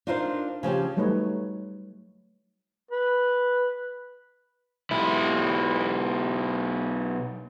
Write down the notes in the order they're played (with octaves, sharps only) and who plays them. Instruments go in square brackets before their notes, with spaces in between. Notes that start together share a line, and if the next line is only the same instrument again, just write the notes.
[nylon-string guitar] D4 D#4 F4 A#4 C5 F5
C#3 F3 C#4 G4
[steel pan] F#3 G3 A3 D#4 B4 C#5
[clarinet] B4
[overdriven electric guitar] B1 E4